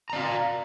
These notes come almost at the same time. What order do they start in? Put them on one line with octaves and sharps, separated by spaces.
A#5 D5 F5